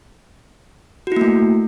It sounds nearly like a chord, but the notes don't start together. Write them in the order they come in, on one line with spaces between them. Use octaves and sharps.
F#4 E4 A#3 A3